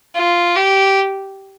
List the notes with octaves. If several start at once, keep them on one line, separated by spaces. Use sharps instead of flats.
F4
G4